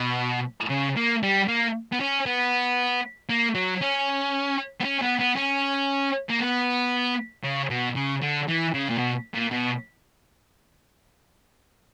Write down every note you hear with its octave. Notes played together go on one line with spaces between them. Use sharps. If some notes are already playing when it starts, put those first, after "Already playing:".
Already playing: B2
C#3
A#3
G3
A#3
B3
C#4
B3
A#3
F#3
C#4
B3
C#4
B3
B3
C#4
A#3
B3
C#3
B2
C#3
D3
E3
C#3
A#2
B2
A#2
B2